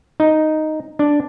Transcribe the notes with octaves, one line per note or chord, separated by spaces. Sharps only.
D#4
D4